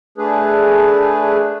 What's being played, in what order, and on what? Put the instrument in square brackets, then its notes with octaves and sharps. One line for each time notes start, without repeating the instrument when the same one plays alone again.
[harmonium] A3 D4 G#4 B4